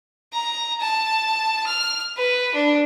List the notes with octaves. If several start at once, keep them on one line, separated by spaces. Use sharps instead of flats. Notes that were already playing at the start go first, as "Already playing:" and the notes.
A#5
A5
F6
B4
D4